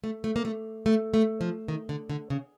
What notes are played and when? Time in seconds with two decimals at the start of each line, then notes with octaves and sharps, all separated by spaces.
0.04 A3
0.24 A3
0.36 A#3
0.45 A3
0.86 A3
1.14 A3
1.41 F3
1.68 D#3
1.89 D3
2.10 D3
2.30 C#3